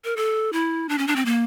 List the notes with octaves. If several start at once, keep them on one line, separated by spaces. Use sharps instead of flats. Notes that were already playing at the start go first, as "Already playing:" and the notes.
A#4
A4
E4
D4
C#4
D4
C4
A#3